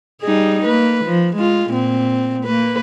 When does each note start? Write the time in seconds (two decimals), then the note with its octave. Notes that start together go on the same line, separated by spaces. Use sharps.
0.22 G3 D#4 G#4
0.65 A#3 B4
1.05 F3
1.36 G#3 F4
1.70 A#2 C4
2.45 A#3 B4